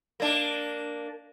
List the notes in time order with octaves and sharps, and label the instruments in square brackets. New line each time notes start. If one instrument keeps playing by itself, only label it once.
[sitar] A#3 D4